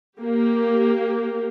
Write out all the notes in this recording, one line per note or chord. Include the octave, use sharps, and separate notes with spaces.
A#3 G4